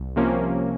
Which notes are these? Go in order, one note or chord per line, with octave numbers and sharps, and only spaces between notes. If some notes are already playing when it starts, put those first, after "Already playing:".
Already playing: C2
C3 F3 A#3 C#4